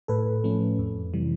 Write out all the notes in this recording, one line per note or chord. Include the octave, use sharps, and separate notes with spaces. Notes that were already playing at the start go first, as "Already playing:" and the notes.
A2 A4 B4
F3 A3 C#4
F2
C3 E3 G3